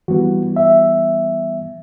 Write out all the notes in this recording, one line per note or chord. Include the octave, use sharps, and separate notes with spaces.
E3 G3 B3 F#4
E5